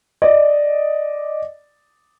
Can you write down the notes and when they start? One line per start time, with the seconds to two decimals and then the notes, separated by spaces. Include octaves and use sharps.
0.22 D5 D#5